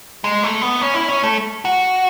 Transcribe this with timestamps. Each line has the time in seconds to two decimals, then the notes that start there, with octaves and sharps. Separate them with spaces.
0.24 G#3
0.43 A3
0.61 B3
0.81 C#4
0.94 E4
1.08 C#4
1.23 A3
1.65 F#4